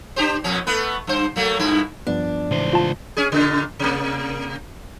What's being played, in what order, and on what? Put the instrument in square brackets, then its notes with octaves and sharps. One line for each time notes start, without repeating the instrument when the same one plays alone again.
[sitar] D4 G4 C5
F2 B2 C#4
A3 B3 B4
G2 C5
F#3 A3 A#3
G2 B2 E4
[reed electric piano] G2 F3 B3 [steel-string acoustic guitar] D4
[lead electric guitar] C#2 C5 [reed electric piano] A2 E3
[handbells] F4 A5
[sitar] C#4 G#4
A#2 C#3
C3 A#3